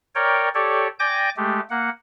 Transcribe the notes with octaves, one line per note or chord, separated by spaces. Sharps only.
A#4 C#5 D5 G5
G4 A4 C#5 D5
D5 G5 G#5 D6 G6 A#6
G#3 A3 G4
A#3 F#5